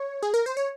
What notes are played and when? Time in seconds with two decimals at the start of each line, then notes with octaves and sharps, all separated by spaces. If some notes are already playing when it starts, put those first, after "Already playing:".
Already playing: C#5
0.23 G#4
0.34 A#4
0.46 C5
0.57 C#5